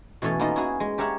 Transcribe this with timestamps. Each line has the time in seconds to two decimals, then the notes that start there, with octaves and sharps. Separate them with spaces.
0.22 B2 E3 A3 C#4 A4
0.40 A#3 B3 D#4 F4 A#4
0.56 C#4 E4 F#4 G#4
0.80 G#3
0.98 G4 A#4 C#5 E5 F#5